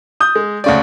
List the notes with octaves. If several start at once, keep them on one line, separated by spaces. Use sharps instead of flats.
D#6 G6
G#3
D2 C#3 D5